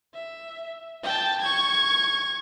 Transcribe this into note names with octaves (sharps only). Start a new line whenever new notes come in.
E5
G5 A5
C#6 G#6